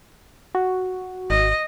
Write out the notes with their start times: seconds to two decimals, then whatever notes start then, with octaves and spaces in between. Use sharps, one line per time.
0.55 F#4
1.30 G#1 D#5